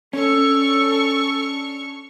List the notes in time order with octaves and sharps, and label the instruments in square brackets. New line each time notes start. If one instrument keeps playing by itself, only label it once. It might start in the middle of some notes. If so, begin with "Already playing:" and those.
[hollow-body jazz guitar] C#4 [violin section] D4 C#6 F6 [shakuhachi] A4